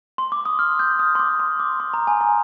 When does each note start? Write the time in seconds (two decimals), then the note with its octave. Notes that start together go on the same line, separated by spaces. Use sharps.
0.18 C6
0.32 D6
0.45 D#6
0.59 F6
0.79 G6
0.99 D#6
1.15 C6
1.19 D6
1.40 C6
1.60 D6
1.80 C6
1.94 A#5
2.07 G#5
2.21 A#5